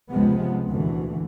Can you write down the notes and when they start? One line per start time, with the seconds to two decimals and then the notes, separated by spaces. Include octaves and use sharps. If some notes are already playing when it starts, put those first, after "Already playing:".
0.11 C#2 C3 F3 G#3 B3
0.70 D2 A#2 E3